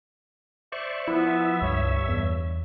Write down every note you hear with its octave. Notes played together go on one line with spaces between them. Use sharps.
C5 D5 E5 C#6
F3 B3 E4 E5
C#2 G2 C#5
E2